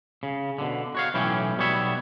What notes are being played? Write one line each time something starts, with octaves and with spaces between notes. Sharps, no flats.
C#3
B2 D3
F#4 C#5 F5
B1 A2 E3 C#4 E4 G5
B1 B2 G3 B3 C#5 E5